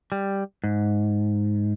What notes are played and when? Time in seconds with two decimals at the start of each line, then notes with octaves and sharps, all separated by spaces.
0.12 G3
0.64 G#2